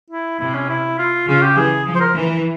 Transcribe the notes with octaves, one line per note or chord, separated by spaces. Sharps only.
E4
C3 E4
C#4
E4
F4
C#3 F4
G4
E3 G#4
F3
C5
A#4
E3